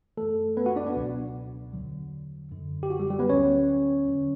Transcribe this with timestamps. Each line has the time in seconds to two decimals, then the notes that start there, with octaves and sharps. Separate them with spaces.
0.17 F#2 E3 A3 A4
0.57 B3 B4
0.66 F#4 F#5
0.76 D4 D5
0.86 B3 B4
0.96 C#2 B2 F#3
1.73 E2 D3 F#3
2.51 F#2 D3 F#3
2.83 G4
2.90 F#4
3.00 G3 G4
3.10 G3 G4
3.19 B3 B4
3.29 D2 D3 F#3 C#4 C#5
4.08 E2 D3 F#3